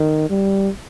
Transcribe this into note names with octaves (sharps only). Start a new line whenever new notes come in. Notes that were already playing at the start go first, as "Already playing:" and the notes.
Already playing: D#3
G3